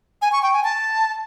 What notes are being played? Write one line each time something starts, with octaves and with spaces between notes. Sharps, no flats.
G#5
C#6
G5
G#5
A5